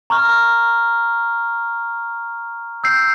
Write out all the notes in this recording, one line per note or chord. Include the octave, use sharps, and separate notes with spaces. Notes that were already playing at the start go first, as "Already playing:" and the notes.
A#5 C#6 F6
E6 G6 C7